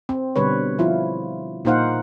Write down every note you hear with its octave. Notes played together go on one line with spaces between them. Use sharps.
C4
B2 D3 G3 B4 C#5
F3 E4 F4
A#2 A#3 D#4 C5 F5 F#5